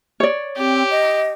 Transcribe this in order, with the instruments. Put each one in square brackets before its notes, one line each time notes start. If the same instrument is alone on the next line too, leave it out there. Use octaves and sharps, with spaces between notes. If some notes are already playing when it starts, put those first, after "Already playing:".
[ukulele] C#5 D5
[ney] C4 [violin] G4
[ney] D#5